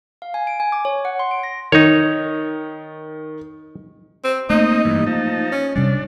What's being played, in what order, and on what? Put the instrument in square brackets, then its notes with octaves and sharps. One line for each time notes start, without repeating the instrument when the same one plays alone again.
[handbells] F5
G#5
D7
G#5
D6
C#5
F#5
C6
D7
A#6
[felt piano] D#3 [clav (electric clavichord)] D#4 C#5
[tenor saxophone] C4
[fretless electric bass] A3 A#3 [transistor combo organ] C4 D#5 [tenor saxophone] D#4
[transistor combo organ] G2 E3
[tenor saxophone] F3 [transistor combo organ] D#4 A5
[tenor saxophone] C#4
[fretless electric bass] C3 G3 [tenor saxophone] C#4 [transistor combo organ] D4